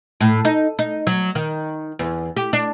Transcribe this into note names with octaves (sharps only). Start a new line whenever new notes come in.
A2
D#4
D#4
F#3
D#3
E2
G4
D4